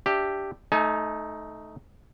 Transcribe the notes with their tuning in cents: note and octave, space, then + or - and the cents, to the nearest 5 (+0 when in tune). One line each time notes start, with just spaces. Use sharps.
D4 +0 G4 +0 E5 +5
A3 -15 D#4 +0 G#5 +40